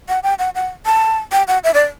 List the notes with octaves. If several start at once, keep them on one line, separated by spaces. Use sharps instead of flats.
F#5
G5
F#5
F#5
A5
G5
F#5
E5
D5